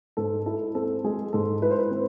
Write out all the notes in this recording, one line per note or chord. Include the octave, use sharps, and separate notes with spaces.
G#2 A4
E4 A4
C4 A4
G#3 G#4
G#2 A4
E4 B4
C5
B4
C4 C5